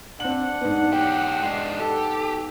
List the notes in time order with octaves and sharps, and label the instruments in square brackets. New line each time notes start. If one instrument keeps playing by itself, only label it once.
[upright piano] C4 F#7 [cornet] D4 [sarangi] F#5
[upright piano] G#2 B3
[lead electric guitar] E3 G4 [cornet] G5
[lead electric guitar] G#3 D4
[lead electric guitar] G4 [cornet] A4